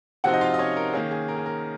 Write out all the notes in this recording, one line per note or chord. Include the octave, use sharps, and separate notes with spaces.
C3 F3 C4 D#4 F#4 F#5
D#5
F4 F5
D#5
C#4 C#5
A#4
D#3 A#3 C#4 G#4
G#4
A#4
G#4
A#4